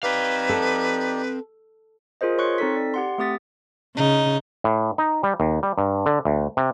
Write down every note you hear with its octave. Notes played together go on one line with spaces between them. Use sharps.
C4 D#4 G4 B4 D5 F5
A4
F4 G#4 A#4 C5 D#5
C#5 C6 C#6 F#6 C#7
C4 D#4 A4 B6
D5
G4 F#5 C6
A3 C4 G4 D#6 A6 B6
C#3 D#4
A2
D#4
G3
D#2
G3
G2
D3
D2
C3